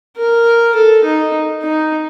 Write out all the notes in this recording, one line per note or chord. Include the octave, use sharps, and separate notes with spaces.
A#4
A4
D#4
D#4